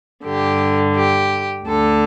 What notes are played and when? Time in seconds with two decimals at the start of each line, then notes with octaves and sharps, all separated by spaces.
0.24 G2 D3 G4
0.95 G4
1.65 D2 D3 A4